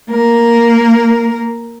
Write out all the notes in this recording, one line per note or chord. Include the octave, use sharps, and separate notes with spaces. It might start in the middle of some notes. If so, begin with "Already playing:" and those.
A#3 A#4